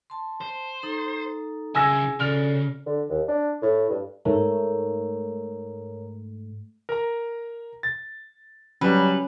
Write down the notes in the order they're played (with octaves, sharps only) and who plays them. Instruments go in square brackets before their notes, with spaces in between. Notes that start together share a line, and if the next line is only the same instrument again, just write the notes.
[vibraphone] A5 C6
[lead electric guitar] C5
[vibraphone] D#4 A4 A#5
[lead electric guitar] C#3 E4 [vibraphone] G#4 [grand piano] G#5 E6 A#6
[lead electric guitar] C#3 [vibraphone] F#4 A4 D5 [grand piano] F6 F7
[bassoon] D3
D#2
D4
A2
G2
[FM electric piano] G#2 A3 [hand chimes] A#4 C#5 A#5
[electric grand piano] A#4 A#5
A6
[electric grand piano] F#3 G3 [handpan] C#4 [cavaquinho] B4